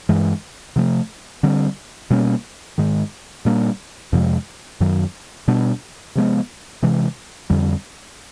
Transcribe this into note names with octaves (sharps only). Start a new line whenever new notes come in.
G2 E3 G#3
C3 F3 A3
D3 G3 C4
B2 G3 A#3 C#4
G#2 D#3 G#3
A#2 G3 A#3 D4
F2 C3 F3 G#3
F#2 D#3 F#3
B2 G3 B3 D4
C3 F3 G#3 B3
C3 E3 G#3
F2 D3 G3